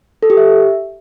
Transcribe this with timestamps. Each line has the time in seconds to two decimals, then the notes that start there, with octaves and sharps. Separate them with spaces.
0.23 A4
0.30 G4
0.37 E5